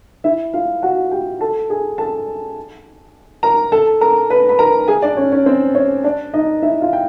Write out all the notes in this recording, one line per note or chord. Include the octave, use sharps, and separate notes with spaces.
E4 E5
F4 F5
F#4 F#5
G4 G5
A4 A5
G#4 G#5
A4 A5
A#4 A#5
A4 A5
A#4 A#5
B4 B5
B5
A#4 A#5
G#4 G#5
D4 D5
C#4 C#5
C#4 C#5
C4 C5
C#4 C#5
D4 D5
D#4 D#5
E4 E5
F4 F5
G5